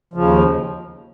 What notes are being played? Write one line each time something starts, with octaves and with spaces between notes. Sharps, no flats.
D#2 C#3 F3